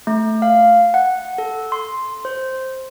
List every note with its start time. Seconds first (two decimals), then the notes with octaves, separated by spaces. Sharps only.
0.07 A3
0.42 F5
0.94 F#5
1.38 A4
1.72 C6
2.25 C5